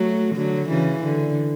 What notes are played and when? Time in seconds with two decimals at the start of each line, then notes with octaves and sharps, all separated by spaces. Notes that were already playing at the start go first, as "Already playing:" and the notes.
Already playing: F#3 A3
0.36 D3 F#3
0.69 C#3 E3
1.04 D3